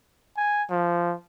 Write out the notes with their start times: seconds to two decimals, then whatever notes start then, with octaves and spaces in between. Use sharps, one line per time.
0.37 G#5
0.70 F3